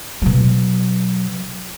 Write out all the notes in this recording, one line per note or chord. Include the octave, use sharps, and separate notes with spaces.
B2 F#3